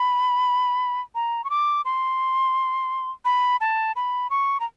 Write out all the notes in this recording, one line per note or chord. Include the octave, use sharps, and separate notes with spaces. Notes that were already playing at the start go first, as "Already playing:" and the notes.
Already playing: B5
A#5
C#6
D6
C6
B5
A5
B5
C#6
A#5